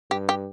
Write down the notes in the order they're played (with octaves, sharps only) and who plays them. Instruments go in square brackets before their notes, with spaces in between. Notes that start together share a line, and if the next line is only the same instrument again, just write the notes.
[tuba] G2 [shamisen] G4
[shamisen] G4